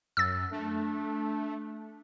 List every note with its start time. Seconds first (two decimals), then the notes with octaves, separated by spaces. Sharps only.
0.17 F#2 E6 A6
0.51 A3 D4